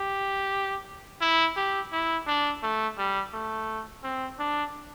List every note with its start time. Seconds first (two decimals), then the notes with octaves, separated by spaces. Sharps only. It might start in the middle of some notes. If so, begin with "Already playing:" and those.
Already playing: G4
1.21 E4
1.56 G4
1.92 E4
2.27 D4
2.63 A3
2.98 G3
3.33 A3
4.04 C4
4.39 D4